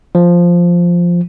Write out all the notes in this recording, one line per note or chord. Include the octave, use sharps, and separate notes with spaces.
F3